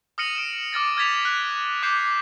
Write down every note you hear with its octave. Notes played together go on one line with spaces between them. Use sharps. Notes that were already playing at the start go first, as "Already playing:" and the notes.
D#6 F6 A#6 C#7 D#7 F#7
D7 E7
D6 F6 A6 A#6
F6 G#6 A6 B6 F7
F#6
D6 G6 C7 C#7